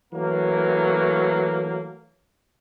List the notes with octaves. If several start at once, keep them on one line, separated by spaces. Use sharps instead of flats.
E3 F#3 A3 A#3